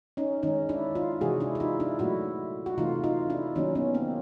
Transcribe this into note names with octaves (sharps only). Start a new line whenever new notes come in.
C#4 D#4
D#3 G#3 C#4 D#4
D4 E4
D#4 F4
C3 E3 G#3 F#4 G#4
D4 E4
E4
D#4 F4
D4 E4
A#2 F#3 A3 E4 F#4
F#4
C3 E3 A3 D#4 F4
D#4 F4
D4 E4
D#3 F#3 A#3 C#4 D#4
B3 C#4
A#3 C4